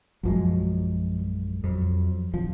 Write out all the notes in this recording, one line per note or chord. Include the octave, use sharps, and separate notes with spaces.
A#1 F#2 F3 F#3 G#3
F2 F3 F#3
D1 F3